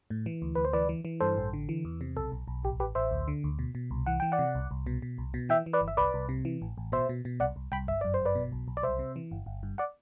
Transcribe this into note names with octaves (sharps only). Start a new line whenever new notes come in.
A2
E3
D2
D2 B4
C5
E3 B4 D5
E3
E3
G2 A4 C5
A1
D3
E3
E2
C3
B1 A4
B1
B1
A1 G4
A1 G4 B4
A1 C5 E5
D2
D3
D2
B2
B2
C2
E3 F#5
E3 G5
D5 F#5
C3
C2
C2
B2
B2
C2
B2
E3 E5 G5
E3
B4 D5
G1
E5
C2 B4 D5
C2
C3
E3
A1
A1
B2 C5 E5
B2
B2
C2 D5 F#5
C2
C2 G5 B5
G1 E5
F#2 D5
C5
G1
B4 D5
B2
B1
B1
D5
C2 C5 E5
C3
E3
G1
G1
G2
D5 F#5